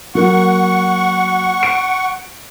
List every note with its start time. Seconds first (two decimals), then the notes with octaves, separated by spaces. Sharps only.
0.15 F#3 A#3 F#5 C#6
1.63 D7